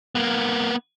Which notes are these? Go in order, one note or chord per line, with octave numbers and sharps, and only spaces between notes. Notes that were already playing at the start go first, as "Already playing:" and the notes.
A#3 B3